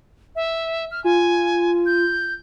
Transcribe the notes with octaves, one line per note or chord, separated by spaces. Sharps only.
E5
F6
F4 G#5
G6